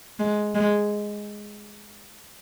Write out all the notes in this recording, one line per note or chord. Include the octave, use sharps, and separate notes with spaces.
G#3
G#3